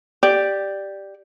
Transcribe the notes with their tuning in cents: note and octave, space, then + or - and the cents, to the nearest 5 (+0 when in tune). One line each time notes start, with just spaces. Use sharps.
G4 +0 D5 +5